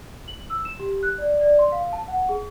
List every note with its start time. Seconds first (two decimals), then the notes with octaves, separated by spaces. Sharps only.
0.28 F#7
0.50 E6
0.65 E7
0.79 G4
1.03 F#6
1.18 D5
1.41 D5
1.59 C6
1.72 F5
1.93 A5
2.08 F#5
2.29 G#4